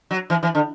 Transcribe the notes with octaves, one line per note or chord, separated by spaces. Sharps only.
F#3
E3
E3
D3